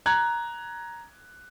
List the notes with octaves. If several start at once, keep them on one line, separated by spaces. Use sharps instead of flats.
A#5 F#6 G#6